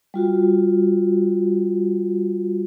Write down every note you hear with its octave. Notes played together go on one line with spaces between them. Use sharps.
G3 F4 F#4